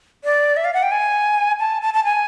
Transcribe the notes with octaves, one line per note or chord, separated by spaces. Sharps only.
D5
E5
F5
F#5
G5
G#5
A5
A5
A5
G#5